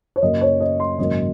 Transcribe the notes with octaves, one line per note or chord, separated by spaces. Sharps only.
C#5
F#2 C#3 F#3 A#3 D#5
C#5
D#5
C6
G#1 F#2 C#3 F#3 A#3 D#5